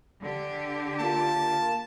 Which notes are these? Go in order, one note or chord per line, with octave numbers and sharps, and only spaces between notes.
D3 G4
A#3 F4 A5